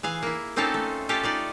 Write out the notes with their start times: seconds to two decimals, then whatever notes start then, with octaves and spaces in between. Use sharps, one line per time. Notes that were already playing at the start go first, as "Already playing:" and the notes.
0.03 E3 G#4 F5
0.23 A#3 E4
0.56 A#3 C4 C#4 D#4 F4 A4
0.74 A3
1.09 C#4 F4 G4 A4
1.23 D#4 F4 D5